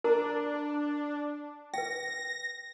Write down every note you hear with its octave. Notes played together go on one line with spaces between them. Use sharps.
D4 A#4 A#5
B4 G5 A#6